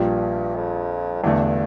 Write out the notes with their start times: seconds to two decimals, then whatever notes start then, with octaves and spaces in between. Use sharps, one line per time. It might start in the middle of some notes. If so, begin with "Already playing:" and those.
Already playing: A#1 G2 A#2 G3
0.55 F2
1.23 E2 G2 D3 A3